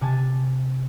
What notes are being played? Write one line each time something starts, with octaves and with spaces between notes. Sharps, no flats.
C3 G#5 A5